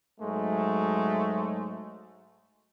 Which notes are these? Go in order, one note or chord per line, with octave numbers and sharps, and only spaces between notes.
G#2 F#3 G#3 A3